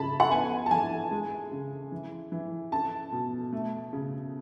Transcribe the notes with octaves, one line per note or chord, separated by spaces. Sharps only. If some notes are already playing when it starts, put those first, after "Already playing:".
Already playing: C#3 A5 B5
F#5
B3 G#5
A5
E3 G#5
G#3
C#3
E3
E3
C#4 A5
B2
A3
C#3